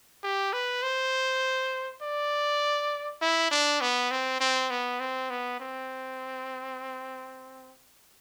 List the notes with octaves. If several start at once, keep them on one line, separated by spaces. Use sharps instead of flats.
G4
B4
C5
D5
E4
D4
B3
C4
C4
B3
C4
B3
C4